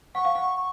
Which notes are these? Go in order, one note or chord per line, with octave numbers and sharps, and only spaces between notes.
F#5 C#6
F5
F#5
C#6